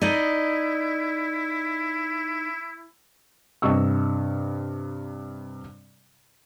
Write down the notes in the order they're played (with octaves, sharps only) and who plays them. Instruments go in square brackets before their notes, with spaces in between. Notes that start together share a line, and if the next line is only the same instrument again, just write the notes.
[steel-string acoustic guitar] D#4 D5 D#5 [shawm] E4
[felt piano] G2 C3 D#5 C#6 E6